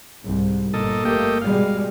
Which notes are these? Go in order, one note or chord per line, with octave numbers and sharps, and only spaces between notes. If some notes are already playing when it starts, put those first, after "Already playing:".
C2 G#2
G1 A#2 A4 D#5
A3 A#3 G4 D#5
B2 G3 G#3 F5